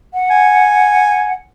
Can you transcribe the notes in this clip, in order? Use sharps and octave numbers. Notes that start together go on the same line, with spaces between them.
F#5
G#5